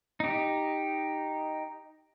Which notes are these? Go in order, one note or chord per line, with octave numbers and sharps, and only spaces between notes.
D#4 G4